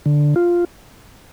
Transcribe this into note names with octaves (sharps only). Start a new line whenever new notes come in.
D3
F4